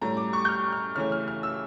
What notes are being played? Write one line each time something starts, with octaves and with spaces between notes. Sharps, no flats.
A2 G3 C#4 A#5
D6
C#6
G6
F6
F6
C#3 E3 A3 C#4 F6
F6
F6
E6